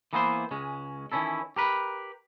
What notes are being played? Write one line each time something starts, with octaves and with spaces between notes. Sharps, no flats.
E3 A#3 B3 E4 G#4 C5
C#2 G#3 C#4
D#3 E3 G#3 C#4 E4 A4
G4 A#4 B4